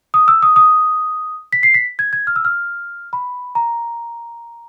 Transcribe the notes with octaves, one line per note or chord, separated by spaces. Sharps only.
D#6
E6
D#6
D#6
B6
C7
B6
G#6
G#6
F6
E6
F6
B5
A#5